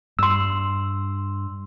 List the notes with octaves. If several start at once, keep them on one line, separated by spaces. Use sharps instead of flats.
G2 C6 E6